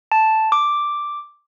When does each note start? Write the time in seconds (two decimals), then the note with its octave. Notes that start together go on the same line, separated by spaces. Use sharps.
0.12 A5
0.52 D6